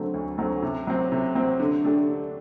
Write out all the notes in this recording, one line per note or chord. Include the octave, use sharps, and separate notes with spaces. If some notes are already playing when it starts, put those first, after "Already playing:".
Already playing: D3 F#3 A3 C4
D2
D3 F#3 A3 C4
C3
F#3 C4
C3
F#3 C4
D3
A3 D4 G4
D3